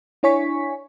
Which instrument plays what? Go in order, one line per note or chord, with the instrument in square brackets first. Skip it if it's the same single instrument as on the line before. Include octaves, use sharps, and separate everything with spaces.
[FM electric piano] D4 E4 C#5 G#5 C#6 B6